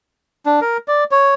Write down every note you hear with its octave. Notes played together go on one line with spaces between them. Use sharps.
D4
A#4
D5
C#5